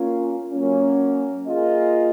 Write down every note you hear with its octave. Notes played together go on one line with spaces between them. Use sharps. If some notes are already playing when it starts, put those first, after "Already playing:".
Already playing: A#3 C#4 F4
F#3 A#3 C#4
A#3 F4 G#4 D#5